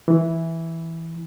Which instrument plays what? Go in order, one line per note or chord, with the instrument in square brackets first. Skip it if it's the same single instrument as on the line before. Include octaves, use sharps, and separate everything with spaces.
[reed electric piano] E3